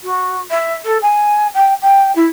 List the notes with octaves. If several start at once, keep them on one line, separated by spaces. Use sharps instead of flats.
F#4
E5
A4
G#5
G5
G5
E4